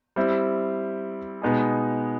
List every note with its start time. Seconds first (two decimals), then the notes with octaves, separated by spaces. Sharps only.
0.16 G3 C4 E4
1.42 B2 G#3 B3 D#4 G#4